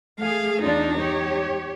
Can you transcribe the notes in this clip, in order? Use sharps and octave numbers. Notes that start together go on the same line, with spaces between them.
A3 G#4 F5
E2 D4 D#4 F4
G4 C#5